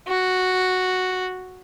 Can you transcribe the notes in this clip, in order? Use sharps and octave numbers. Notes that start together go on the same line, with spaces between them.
F#4